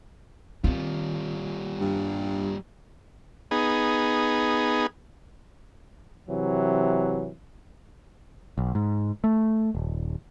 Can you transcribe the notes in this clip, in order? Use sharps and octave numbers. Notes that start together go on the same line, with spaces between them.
D#3 G3 C4 F4
G2
B3 D#4 G#4
C3 E3 F#3
B1
G#2
A3
D#1